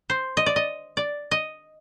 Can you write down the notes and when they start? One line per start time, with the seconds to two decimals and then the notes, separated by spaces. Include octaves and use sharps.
0.10 C5
0.37 D#5
0.46 D5
0.56 D#5
0.97 D5
1.31 D#5